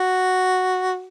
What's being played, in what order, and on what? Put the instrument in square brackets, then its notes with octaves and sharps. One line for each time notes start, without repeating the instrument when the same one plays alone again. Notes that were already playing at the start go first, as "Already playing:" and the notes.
Already playing: [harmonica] F#4